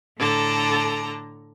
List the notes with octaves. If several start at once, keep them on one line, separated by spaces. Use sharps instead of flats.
A2 D3 A4 A#5